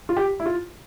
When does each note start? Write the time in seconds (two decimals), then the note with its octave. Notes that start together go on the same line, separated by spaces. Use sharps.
0.09 F4
0.17 G4
0.40 E4
0.46 F4